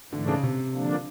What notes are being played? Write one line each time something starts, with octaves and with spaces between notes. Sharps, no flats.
G#2 D3 E3 A3 D4
C#3
C3
D3 F3 A#3 D4